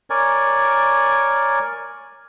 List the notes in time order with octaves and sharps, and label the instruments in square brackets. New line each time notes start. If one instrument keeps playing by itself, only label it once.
[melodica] A#4 C#5 D5 G#5